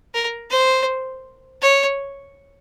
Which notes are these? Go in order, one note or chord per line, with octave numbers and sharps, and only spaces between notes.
A#4
C5
C#5